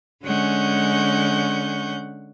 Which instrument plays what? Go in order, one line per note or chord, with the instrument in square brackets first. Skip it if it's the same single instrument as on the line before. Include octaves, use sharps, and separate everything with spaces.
[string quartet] D3 G#3 C#4 F#5 C#6 G6